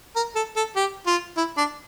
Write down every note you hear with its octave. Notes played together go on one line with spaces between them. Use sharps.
A#4
A4
A4
G4
F4
E4
D4